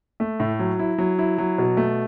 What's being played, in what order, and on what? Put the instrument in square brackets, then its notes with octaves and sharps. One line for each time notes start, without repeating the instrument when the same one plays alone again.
[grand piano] A3
A2
F#3
E4
F#3
E4
F#3
B2
A3